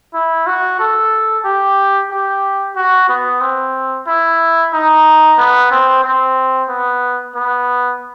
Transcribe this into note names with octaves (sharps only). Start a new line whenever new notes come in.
E4
F#4
A4
G4
G4
F#4
B3
C4
E4
D#4
B3
C4
C4
B3
B3